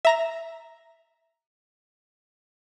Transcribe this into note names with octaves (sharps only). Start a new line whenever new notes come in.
E5 A#5 A#6